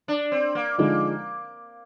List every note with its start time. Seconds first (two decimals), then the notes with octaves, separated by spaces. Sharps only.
0.08 D4
0.32 C4
0.55 A#3
0.78 D3 F3 G#3 A#3 D#4